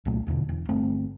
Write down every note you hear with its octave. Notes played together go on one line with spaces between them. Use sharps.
C2 A#2 F#3 A3
D#1 E2 B2 D3
E1
G1 A3 C4